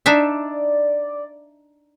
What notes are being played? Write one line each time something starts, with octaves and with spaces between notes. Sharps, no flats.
D4 D#4 D5 E5